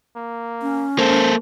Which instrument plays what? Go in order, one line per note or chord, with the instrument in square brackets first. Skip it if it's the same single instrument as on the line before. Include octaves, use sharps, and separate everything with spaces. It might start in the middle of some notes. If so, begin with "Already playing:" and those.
[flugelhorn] A#3
[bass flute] C#4
[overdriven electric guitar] A#3 A4 [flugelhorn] C5